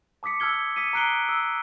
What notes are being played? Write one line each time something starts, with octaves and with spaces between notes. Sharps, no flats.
A5 D6 D#6 B6 C#7
A5 E6 F6 G#6 G7
D#6 B6 C#7 D#7
A#5 D#6 F#6 C7 D7 G7
E6